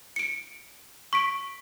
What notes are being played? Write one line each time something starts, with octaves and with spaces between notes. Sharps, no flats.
C#7 D7
C#6 B6 D7